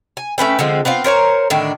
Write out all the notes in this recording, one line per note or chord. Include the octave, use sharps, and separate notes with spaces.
G#5
A3 C#4 B4 G5
D3 F3 G#3 C4
B3 C4 F4 F5
A#4 C5 C#5 A#5
A2 D3 D#3 D4